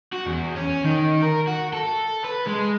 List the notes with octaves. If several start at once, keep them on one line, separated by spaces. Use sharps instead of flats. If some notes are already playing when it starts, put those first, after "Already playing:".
F#4
E2
C#4
D#3
A#4
F#4
A4
B4
G#3